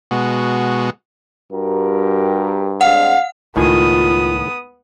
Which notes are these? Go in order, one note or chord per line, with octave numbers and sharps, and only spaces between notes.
B2 G#3 F#4
G2 F#4 G4 A#4
G#3 C4 D4 F5 F#5
C#2 A2 D#3 B3 F4 G#5 D#6